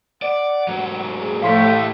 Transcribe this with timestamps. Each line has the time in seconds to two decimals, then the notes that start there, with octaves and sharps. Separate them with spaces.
0.22 D5 F#5
0.68 G#2 F#3
1.20 G#4
1.42 A2 F3 A3 C#5 F5 C6 B6
1.64 G4 D#5